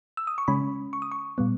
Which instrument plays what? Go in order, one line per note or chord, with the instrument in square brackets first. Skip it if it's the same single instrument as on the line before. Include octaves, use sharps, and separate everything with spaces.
[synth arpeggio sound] E6
D#6
C#6
C#3 G#3 C#4 B5
C#6
D#6
C#6
A#2 G3 B3